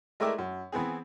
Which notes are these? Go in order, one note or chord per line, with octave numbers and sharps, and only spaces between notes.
G#3 A3 E4 A#4 D5 E5
F#2
E3 B3 C4 G#4